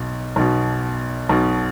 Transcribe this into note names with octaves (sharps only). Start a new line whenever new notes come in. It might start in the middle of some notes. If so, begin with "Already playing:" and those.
Already playing: B1 B2
B1 B2
B1 B2